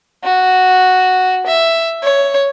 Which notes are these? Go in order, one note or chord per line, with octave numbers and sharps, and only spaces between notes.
F#4
E5
C#5